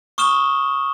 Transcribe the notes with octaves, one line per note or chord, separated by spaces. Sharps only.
C#6 D#6 F6 E7 G7